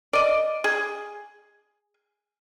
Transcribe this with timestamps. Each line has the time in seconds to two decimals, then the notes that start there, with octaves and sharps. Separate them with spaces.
0.13 D5 D#5
0.64 G#4